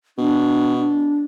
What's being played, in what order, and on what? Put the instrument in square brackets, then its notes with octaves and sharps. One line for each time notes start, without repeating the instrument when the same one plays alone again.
[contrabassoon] B2 [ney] D4
[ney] D4